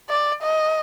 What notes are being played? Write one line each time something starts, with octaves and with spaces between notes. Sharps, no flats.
D5
D#5